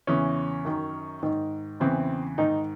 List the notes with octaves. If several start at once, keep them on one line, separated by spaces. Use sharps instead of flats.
E2 C#3 E3 C#4
F#2 D#3
G#2 D#3
E2 C#3 E3 C4
G#2 D#3 D#4